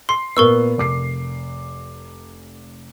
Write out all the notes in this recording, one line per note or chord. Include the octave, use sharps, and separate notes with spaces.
C6 C7
A#2 B3 A#4 C#6 E6
F1 D6 C7